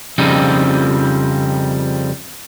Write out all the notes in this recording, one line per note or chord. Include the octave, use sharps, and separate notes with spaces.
F2 C#3 F3 G3 C4 D#4